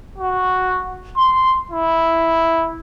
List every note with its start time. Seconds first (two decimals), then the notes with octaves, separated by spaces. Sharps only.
0.18 F#4
1.17 C6
1.71 E4